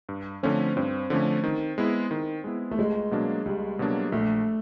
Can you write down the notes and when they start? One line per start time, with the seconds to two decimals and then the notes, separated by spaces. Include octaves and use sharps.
0.09 G2
0.43 D3 F3 A3 C4 C#4
0.76 G2 C4
1.10 D3 F3 A3 C#4
1.44 D#3
1.78 G#3 B3 E4
2.11 D#3
2.44 G#3 B3 E4
2.71 A3
2.78 C#2 G#3
3.11 B2 F#3 A#3 D4
3.46 C#2 G3
3.79 B2 F#3 A#3 D4
4.12 A#1 A3